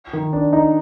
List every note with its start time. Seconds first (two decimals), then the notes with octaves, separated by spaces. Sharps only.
0.13 D#3
0.33 D4
0.53 D#4